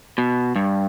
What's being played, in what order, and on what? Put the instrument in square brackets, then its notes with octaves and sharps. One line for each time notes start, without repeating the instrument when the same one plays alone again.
[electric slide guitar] B2
G2